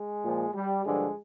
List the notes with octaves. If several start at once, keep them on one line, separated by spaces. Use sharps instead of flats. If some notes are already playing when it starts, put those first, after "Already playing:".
Already playing: G#3
A#2 F3
G3
G2 D3 F3 G#3